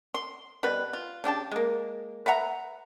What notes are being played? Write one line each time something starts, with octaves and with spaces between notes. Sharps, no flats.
C6
B2 G3 B4
F4
C#3 D4 G4 A5
G#3 A#3
B4 E5 F#5 A#5